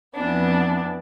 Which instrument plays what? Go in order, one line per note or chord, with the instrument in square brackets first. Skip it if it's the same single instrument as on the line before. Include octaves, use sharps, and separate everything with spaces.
[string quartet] F2 E3 B3 D4